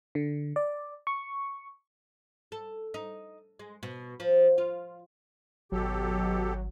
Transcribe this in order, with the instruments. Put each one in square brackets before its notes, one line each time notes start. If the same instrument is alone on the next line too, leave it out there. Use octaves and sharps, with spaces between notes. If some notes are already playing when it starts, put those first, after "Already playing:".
[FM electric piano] D3
D5
C#6
[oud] A4
D#4
G#3
B2
F3
F4
[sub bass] G#1 [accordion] B2 G4 A4 [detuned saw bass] F#3